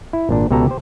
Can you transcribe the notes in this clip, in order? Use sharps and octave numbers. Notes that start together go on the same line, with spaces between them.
E4
G#1 A#2 D4
C#2 B2 G4 A4 A#5
G4 C5